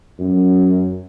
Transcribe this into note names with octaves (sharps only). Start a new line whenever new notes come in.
F#2